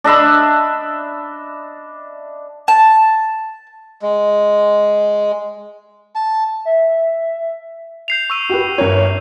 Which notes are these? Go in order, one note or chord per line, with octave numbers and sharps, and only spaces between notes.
D4 D#5 E5 B5
A5
G#3
A5
E5
G6 C7 F7
C#6 E6 D#7
F#4 G4 B4
G1 A#4 C#5